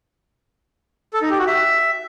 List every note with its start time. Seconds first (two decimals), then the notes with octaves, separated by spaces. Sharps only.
1.14 A4
1.22 D#4
1.30 G4
1.39 F#4
1.47 E5